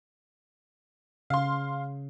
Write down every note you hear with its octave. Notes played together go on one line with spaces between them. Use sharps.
C#3 F5 C6